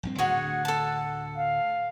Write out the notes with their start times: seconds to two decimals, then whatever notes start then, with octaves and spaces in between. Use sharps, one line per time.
0.03 A#1 G2 C4
0.18 D2 A2 D3 F#4 G#4 C#5 F#5
0.65 A4 A5
1.36 F5